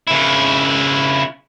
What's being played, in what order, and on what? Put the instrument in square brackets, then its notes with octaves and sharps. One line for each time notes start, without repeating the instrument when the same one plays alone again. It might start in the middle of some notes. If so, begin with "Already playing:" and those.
[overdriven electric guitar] C#3 E4